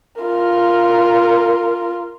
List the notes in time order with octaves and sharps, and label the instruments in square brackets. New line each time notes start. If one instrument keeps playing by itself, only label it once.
[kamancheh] F4 A#4